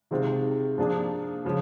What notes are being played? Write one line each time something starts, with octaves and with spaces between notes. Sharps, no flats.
C3 D#3 G#3 C4 F4
F3 A#3 D4 F4 G#4
C#3 F3